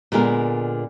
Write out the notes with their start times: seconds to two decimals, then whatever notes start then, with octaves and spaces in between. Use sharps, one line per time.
0.12 A#2 D3 G#3 B3 A#4